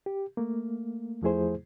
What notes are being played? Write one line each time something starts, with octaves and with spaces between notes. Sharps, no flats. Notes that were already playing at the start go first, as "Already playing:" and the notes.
G4
A3 A#3
E2 F3 A3 E4 G#4 C5